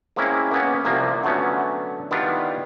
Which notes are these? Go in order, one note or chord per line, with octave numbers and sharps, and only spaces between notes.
G#3 A#3 C4 C#4 E4
A#3 B3 C#4
C2 C3 F3 A#3
D3 F#3 A3 B3 C#4
D#3 G3 B3 D4 E4 F4